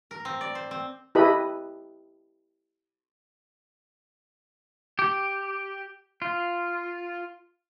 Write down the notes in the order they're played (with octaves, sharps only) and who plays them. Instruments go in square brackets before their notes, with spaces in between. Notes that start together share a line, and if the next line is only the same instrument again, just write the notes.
[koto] A#4
C4
D5
C5
C4
[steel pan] E4 G4 A4 B4 D#5 B5
[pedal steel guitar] G4
F4